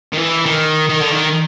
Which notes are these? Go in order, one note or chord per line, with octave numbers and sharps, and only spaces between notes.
D#3
E3
D#3
D#3
D3
D#3